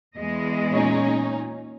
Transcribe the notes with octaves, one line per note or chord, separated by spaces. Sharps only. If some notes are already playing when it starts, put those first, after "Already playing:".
E2 G#3 D#5
A#2 C#4 D#4